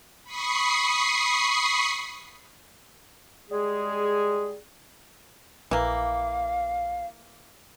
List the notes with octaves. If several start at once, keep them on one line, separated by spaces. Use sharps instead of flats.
B5 C#6 D#6 C7
G3 G#3 G#4
A#1 E3 A#3 F5